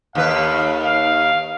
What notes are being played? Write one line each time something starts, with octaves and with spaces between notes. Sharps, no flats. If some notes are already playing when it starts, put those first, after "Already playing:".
D#2 A4 B4 F5
F5